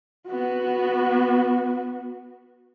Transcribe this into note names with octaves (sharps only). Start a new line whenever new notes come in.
B3 F#4